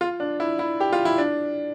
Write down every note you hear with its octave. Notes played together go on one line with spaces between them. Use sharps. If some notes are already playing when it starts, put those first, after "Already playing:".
F4
D4
E4
E4
G4
F4
E4
D4